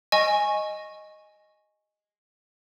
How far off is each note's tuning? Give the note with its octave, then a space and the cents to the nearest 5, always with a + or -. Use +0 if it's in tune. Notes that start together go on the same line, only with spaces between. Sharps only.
D#5 +0 G#5 +0 C#6 -15